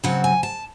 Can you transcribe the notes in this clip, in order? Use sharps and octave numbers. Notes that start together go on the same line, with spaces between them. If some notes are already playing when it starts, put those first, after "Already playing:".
C#3 F#3 C4 F#5
G#5
A5